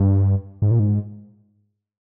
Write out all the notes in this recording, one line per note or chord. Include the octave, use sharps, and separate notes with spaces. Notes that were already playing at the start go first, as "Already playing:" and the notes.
Already playing: G2
G#2
A#2
G#2